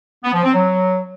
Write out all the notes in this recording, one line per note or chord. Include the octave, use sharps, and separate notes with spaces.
B3
F3
C4
F#3